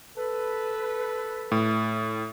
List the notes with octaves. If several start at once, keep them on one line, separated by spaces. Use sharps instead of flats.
A4 B4
A2